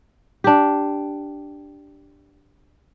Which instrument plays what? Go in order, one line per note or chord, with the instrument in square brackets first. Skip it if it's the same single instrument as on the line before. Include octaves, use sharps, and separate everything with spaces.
[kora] D4 G4